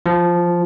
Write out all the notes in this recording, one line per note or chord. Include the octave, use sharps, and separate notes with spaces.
F3